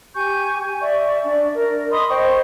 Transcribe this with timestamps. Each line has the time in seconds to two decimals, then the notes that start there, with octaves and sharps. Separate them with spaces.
0.15 G4 G#5 C#6 G6
0.81 D5 E5 C#6
1.24 D4 D5
1.53 A#4
1.91 D#5 B5 C6 D#6
2.09 C5 D#5 G5 C#6